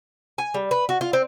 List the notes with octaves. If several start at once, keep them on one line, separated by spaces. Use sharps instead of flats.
G#5
G3
B4
F#4
F4
C4